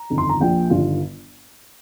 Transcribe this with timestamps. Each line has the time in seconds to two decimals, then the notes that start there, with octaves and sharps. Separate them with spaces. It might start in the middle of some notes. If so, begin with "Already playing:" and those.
Already playing: A#5
0.10 G1 F2 D#3
0.18 C6
0.29 A#5
0.40 A#1 A#2 F3 G5
0.70 G1 G2 D#3 F4